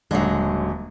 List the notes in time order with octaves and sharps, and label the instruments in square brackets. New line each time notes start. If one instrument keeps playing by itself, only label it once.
[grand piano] D#1 D3 [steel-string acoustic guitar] F#3 G#3